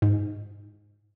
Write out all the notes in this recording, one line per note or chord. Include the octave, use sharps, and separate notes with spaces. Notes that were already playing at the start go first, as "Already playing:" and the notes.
G#2